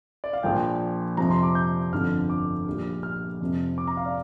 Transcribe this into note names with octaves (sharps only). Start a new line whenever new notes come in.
D5
F5
A#1 A#2 F3 G5
F2 C3 F3 A#5
C6
D6
G6
G1 F2 D3 F3 F6
D6
A#1 A#2 G3
F6
F2 C3 F3
D6
A#5
F5
D5